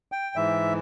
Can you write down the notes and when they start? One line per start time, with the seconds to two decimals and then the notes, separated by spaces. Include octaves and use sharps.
0.12 G5
0.36 G#2 E3 E5